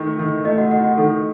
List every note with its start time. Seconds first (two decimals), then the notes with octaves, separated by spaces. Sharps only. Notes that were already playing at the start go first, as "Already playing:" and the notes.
Already playing: D#3 A3 D#4
0.19 D#3
0.45 A3 D#4 D#5
0.58 F#4 F#5
0.71 D#4 F#4 F#5
0.84 F#4 F#5
0.98 D#3 A4